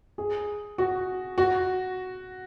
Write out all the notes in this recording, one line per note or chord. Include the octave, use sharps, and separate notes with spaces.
G#4
F#4
F#4